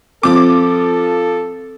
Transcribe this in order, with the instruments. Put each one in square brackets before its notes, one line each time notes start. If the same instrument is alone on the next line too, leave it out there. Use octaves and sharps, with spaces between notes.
[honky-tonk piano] F3 D6 [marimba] C4 [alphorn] A4